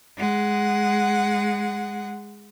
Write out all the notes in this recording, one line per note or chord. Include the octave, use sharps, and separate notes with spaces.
G#3 F#5